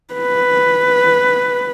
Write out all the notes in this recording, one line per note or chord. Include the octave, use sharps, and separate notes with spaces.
B4